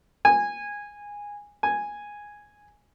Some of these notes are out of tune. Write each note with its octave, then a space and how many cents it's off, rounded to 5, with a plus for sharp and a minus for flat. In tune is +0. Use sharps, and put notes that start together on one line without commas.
G#5 -15
G#5 -5